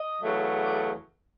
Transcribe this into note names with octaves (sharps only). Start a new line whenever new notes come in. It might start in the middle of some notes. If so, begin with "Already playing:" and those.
Already playing: D#5
E2 C#3 F#3 A3
D5